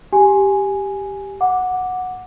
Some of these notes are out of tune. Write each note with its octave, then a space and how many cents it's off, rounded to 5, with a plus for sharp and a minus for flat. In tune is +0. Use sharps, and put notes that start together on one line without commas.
G4 +0 G#5 +0
F#5 -10 D6 +0